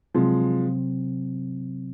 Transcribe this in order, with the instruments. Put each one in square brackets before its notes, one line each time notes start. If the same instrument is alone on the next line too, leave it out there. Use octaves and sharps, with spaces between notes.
[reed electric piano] C3 F#3 C4 [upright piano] F3 G#3